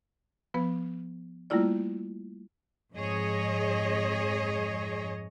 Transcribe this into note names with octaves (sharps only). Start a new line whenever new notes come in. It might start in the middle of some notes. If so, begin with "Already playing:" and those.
F3 B3 B4
G3 A3 A#3 E4 F4 D5
F2 G#2 G#4 C#5 D#5